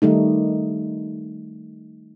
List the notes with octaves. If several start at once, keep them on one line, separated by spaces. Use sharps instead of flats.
D#3 G3 A3 D#4